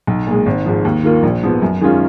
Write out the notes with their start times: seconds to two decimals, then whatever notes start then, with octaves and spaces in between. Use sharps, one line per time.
0.07 B1
0.27 A#2 G#3
0.46 G#1
0.66 G#2 F3
0.85 D#2
1.04 D#3 A#3 F4
1.23 A#1
1.43 G#2 F3 B3
1.62 F#2
1.81 D#3 G#3 C#4 F4